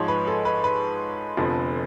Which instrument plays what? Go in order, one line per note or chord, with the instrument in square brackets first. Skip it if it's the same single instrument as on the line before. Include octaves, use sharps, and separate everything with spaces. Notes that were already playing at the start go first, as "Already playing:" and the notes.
Already playing: [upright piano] G#2 F3 G#3 C#5
B4
A4
B4
B4
F1 F2 D3 F3 B3